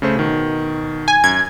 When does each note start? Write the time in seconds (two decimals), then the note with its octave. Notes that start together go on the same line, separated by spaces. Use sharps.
0.02 C#3 A3 C5
0.16 B2 D#3
1.08 G#5
1.24 F#2 G#6